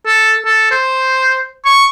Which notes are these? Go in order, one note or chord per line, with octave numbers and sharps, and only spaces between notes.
A4
A4
C5
C#6